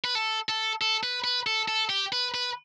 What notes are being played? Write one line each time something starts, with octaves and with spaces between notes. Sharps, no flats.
B4
A4
A4
A4
B4
B4
A4
A4
G4
B4
B4